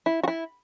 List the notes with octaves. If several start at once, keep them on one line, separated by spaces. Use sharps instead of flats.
E4
F#4
E4